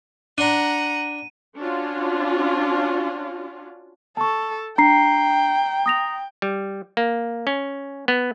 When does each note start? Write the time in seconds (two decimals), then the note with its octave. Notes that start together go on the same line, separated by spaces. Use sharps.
0.38 D4 F#5 A#5 C6 D#7
1.60 C#4 D4 F4 F#4
4.17 A4 A5 C#6
4.78 D4 G5 A#5 C7
5.86 D#6 A#6 F7
6.42 G3
6.97 A#3
7.47 C#4
8.08 B3